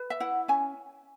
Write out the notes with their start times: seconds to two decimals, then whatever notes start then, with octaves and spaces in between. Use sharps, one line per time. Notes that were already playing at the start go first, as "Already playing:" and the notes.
Already playing: B4
0.10 E5
0.20 E4 F#5
0.48 C#4 G#5